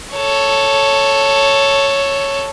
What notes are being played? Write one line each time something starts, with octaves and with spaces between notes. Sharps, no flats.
A4 C#5